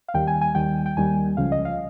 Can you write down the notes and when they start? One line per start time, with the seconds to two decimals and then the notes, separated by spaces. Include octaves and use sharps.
0.08 F5
0.14 D#2 D#3 G3 G5
0.27 G#5
0.41 G#5
0.55 D#2 D#3 G3 G5
0.86 G5
0.97 D#2 D#3 G3 G#5
1.37 C#2 C#3 F3 F5
1.52 D#5
1.65 F5